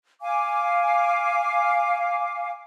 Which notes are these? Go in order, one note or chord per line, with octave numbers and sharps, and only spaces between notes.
F5 G#5 D6